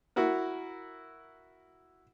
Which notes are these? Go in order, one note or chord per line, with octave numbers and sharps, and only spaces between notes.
E4 F#4 A#4